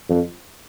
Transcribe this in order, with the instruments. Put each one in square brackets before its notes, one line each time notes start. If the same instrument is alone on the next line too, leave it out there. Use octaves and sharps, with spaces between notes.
[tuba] F2